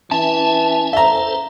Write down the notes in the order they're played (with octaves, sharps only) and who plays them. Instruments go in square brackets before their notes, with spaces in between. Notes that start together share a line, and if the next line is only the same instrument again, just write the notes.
[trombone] E3 [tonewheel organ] C#4 E5 G#5 [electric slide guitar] A5
[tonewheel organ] A4 C5 [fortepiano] E5 A#5